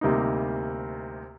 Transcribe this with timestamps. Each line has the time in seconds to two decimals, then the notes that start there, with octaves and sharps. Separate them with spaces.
0.01 D2 C3 G3 A#3 D#4